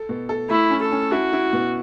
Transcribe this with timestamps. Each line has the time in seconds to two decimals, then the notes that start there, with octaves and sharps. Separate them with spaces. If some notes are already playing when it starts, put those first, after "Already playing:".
Already playing: A4
0.09 B2
0.29 A4
0.49 A3 E4
0.70 C#4
0.81 A4
0.92 C#4
1.12 E4 F#4
1.33 E4
1.53 B2